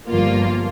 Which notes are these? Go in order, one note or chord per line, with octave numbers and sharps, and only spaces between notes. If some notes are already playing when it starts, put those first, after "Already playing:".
G1 G2 F3 A#3 F4